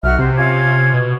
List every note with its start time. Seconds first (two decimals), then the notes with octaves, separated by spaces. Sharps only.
0.03 B1 F#4 E5 F6
0.19 C3 C5
0.36 C#4 F4 G#6
0.94 B2